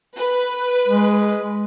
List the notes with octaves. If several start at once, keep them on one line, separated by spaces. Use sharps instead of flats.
B4
G#3